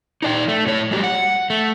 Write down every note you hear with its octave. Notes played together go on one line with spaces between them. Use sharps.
D#4 D5 G5
A3
A2 C#5
G3 G#3 F#4 G4
F#5
A3